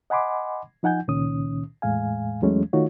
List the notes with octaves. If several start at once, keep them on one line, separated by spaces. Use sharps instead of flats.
D#5 F#5 G#5 B5 C6 D6
F3 D#4 F#5 G#5 G6
C#2 A#2 D#3 C#4 D#6
E2 A2 G#3 F5 G#5
E2 E3 F#3 G#3 A3 C#4
D#3 A3 D#4 F4 F#4 C#5